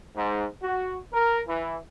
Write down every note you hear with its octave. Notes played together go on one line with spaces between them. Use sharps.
G#2
F#4
A#4
E3